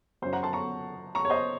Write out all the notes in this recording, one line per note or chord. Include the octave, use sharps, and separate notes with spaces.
F#2 C#3 F#3 C5
F#5 A#5
A5 C6
A#5 C#6
A#5 C#6
C#5
C5 D#5